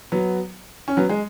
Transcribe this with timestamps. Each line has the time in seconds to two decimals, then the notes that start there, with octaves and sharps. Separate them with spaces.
0.12 F#3 B3
0.88 C#4
0.97 F#3 B3
1.09 G#3